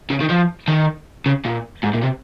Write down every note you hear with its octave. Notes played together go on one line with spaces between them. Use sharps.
C#3
D#3
F3
D#3
C#3
A#2
G#2
A#2
C3